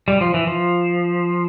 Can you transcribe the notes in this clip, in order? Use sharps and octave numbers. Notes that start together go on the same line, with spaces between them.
G3
F3
E3
F3